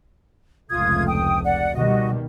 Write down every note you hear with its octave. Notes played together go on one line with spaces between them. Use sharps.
F1 C#2 A3 F4 D#6 G#6
G5 D#6
D5 F#5
B2 D#3 G3 F#4 D#5